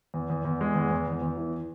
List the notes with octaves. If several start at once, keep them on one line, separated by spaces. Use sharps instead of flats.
E2
E2
E2
G#3
E2
E2
E2
E2
E3